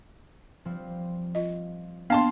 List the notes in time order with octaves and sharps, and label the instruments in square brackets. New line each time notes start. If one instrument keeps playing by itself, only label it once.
[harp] F3 G3 C4
[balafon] F4 D#5
[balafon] A#3 B3 D4 [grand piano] F5 A5 C6